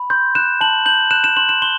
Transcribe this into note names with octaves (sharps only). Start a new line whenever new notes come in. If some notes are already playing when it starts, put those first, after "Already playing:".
Already playing: B5
C6 G6
F#6 E7
A5 F#7
G6 F#7
F#6 E7
E7
C6 F#7
E7
C6 G7